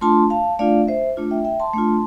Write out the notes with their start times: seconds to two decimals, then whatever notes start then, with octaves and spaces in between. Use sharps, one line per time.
0.01 A3 D4 F4 A5 C6
0.30 F5 A5
0.59 A3 D4 F4 D5 F5
0.88 C5 E5
1.17 A3 D4 F4
1.31 E5 G5
1.45 E5 G5
1.60 A5 C6
1.73 A3 D4 F4